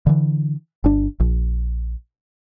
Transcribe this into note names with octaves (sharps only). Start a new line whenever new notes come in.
D3 E3
G1 D4
A#1